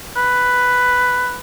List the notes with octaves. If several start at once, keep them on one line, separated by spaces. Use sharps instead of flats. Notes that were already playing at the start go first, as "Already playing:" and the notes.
B4